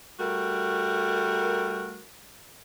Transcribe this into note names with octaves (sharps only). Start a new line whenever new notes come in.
G3 A3 F#4 A#4